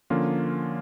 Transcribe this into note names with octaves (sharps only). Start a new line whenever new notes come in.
D3 F3 A#3 C#4 F4